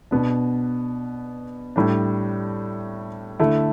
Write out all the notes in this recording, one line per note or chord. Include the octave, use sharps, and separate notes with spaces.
B2 B3 D4
A2 G3 D4
D3 A3 E4